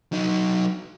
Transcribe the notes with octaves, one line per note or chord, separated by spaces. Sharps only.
F#3 D#4